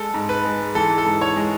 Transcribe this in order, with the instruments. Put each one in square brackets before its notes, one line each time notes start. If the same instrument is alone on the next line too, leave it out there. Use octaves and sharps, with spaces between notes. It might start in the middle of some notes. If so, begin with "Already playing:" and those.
Already playing: [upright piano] G#3 [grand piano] A4
[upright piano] G#2
[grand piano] B4
[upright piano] G#3
[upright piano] E3 [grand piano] A4
[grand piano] A4
[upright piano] G#2
[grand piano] C#5
[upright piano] G#3